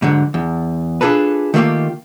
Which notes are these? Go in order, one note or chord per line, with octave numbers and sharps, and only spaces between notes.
G#2 D3 F#3
E2
D4 F4 G#4 A4 B4
D#3 A3 A#3 F4 G4